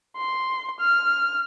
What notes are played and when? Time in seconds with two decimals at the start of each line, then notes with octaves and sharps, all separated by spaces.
0.17 C6
0.80 F6